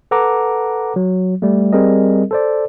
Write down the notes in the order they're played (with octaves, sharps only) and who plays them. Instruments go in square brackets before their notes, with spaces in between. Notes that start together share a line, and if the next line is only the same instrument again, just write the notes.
[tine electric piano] A4 B4 F#5 A#5 D6
F#3
G3 A3
G3 C4 G#4 A#4 D#5
A4 C5 D5